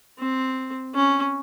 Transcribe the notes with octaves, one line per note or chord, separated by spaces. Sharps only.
C4
C#4